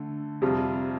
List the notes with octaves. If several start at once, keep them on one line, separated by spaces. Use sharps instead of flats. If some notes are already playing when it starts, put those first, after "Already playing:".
Already playing: D3 A3
F2 C3 G3 F4